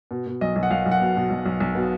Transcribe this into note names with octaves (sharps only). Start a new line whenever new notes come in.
B2
B2
B1 D#5
B1
F#5
B1 F5
B1
F#5
B2
B2
B1
B1
B1
B2